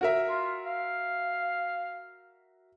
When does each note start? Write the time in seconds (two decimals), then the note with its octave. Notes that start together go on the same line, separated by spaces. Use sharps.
0.01 F#4 A#4 E5
0.29 F4
0.66 F5